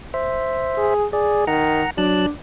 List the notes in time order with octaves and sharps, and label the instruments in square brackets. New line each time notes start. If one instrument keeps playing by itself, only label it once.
[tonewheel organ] C5 E5
[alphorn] G#4
[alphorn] G#4 [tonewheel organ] D5
[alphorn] D#3 [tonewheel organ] F#5 A#5
[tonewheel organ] F#3 A5 F#6 [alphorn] D4